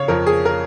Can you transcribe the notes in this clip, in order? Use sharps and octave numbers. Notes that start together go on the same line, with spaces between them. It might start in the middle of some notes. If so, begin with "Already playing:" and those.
Already playing: C#3 C#5 F5
F2 A#4
G#4
A#4